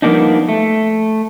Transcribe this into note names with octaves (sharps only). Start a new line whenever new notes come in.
F3 G3 A#3 B3 D4 D#4
A3